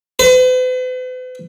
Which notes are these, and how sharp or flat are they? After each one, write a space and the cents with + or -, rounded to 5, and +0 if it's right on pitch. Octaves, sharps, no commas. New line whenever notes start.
B4 +45